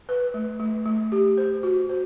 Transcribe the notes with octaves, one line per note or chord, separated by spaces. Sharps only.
B4
A3
A3
A3
G4
C5
F#4
C5